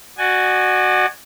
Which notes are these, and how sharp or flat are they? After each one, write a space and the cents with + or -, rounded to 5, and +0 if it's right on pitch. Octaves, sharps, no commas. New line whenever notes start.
F#4 +5 D5 +40 G#5 +0